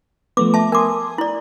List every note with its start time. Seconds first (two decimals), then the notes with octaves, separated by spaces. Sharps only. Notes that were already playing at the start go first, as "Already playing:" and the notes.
0.37 F3 A3 B3 D6
0.54 E5 A5
0.72 A#4 G#5 C6 D6 D#6
1.18 E4 D5